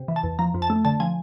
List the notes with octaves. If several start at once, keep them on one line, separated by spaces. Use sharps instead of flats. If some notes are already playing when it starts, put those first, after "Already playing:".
Already playing: C3
E3
A5
E2
F3 A#5
F2
A5
A3
D3 A5
F3 G#5